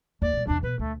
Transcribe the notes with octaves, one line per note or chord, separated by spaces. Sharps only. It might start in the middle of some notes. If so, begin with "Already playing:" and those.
D#2 D5
B2 G3
E2 C3 D4
B2 B4
D2 A3